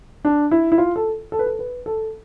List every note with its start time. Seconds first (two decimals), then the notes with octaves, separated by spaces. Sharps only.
0.25 D4
0.51 E4
0.72 E4
0.78 F4
0.96 A4
1.32 A4
1.39 B4
1.46 A4
1.59 B4
1.86 A4